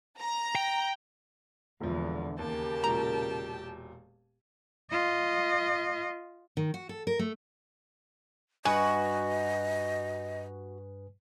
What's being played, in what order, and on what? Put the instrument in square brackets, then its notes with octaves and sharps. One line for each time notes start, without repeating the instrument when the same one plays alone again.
[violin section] A#5
[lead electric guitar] G5
[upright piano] E1 A#2 F3 [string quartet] E2 [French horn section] D3
[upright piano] D#2 [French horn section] C#3 A#4 [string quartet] G4 G5 A5
[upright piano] E1 A#2 [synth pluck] A#5
[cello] F4 D#5
[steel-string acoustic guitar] D#3
F#4
A4
A#4
A3
[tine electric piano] G2 B4 D#6 [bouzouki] F#4 [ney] D#5 [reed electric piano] G#5